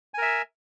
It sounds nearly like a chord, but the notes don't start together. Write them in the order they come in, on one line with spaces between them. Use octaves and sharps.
G#5 A#4 E5